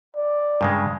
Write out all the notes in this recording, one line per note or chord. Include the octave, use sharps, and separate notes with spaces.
D5
G2 C#3 G#3